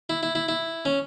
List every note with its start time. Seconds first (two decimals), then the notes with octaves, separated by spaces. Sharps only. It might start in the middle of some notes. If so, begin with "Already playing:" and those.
0.09 E4
0.23 E4
0.35 E4
0.48 E4
0.85 C#4